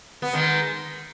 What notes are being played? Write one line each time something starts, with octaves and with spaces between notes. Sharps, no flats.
B3
D#3 G#3